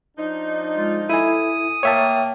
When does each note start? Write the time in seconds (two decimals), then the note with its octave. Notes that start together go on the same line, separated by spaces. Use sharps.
0.17 F3 D4 D#4
0.76 G#3 F4
1.10 E4 A4 G#5 D#6
1.83 A#3 C#5 E5 G5 A5